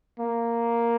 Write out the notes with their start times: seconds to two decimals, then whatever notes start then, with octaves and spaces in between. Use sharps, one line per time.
0.20 A#3